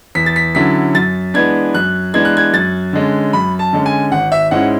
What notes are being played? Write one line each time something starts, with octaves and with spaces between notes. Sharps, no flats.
E2 B6
A6
B6
D3 F#3 C#4 E4 B6
F#2 A6
E3 G#3 B3 D4 G#6
F#2 F#6
E3 G#3 B3 D4 G#6
F#6
G#6
F#2 A6
D3 G#3 C#4
F#2 B5
A5
D3 G#3 C#4
G#5
G#1 F#5
E5
G#2 G#3 C#4 E4 F#5